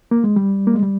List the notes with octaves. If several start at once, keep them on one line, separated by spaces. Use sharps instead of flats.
A#3
G#3
G3
A#3
G#3
G3